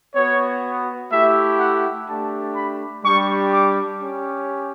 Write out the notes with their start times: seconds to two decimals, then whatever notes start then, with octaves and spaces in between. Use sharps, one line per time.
0.14 B3 F#4 C#5
1.11 A3 E4 G4 E5
1.59 F#5
2.07 A3 D4 G4 A5
2.55 B5
3.04 G3 D4 G4 C#6
3.52 D6
4.00 C#4 G4